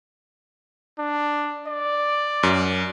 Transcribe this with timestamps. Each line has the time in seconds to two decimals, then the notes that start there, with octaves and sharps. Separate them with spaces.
0.99 D4
1.67 D5
2.43 F#2